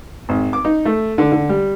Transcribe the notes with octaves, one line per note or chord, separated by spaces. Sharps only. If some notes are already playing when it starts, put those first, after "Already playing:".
G#1
D6
D#4
A3
D3
D3
G3